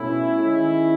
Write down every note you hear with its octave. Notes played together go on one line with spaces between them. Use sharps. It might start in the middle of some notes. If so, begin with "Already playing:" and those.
Already playing: B2 A3 C#4 E4
D#3 G#3